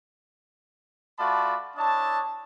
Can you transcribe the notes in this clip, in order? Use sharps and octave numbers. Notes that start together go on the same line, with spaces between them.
A3 F4 F#4 D5 A5 B5
D4 E4 C#5 D#5 A5